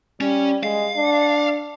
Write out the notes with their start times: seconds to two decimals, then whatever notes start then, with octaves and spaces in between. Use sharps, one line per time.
0.21 G3 C#4
0.63 G#3 F5
0.97 D4